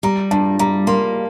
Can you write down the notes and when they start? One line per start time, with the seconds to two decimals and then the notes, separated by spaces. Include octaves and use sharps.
0.03 G3 A#5
0.31 G2 A5
0.59 G3 A#5
0.87 A#3 C6